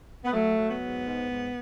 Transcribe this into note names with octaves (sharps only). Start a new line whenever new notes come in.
B3
F#3 A3
F#3
B3
G#2
G#2
G#2